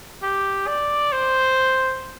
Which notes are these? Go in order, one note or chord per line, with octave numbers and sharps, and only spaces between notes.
G4
D5
C5